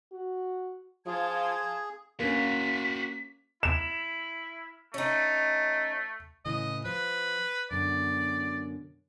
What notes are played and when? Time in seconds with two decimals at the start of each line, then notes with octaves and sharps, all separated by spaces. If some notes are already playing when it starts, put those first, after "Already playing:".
0.13 F#4
1.06 F3 F4 G#4 A5 G#6
2.20 A#3 C#4 F#4 F5 B6
3.63 E4 E7
4.94 A3 C#4 D#4
6.45 A2 C#3 E3 D#5
6.85 F3 B4 C5
7.71 F#2 B2 D3 D5